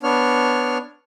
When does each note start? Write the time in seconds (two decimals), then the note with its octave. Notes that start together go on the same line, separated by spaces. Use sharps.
0.03 B3 D4 C#5 F6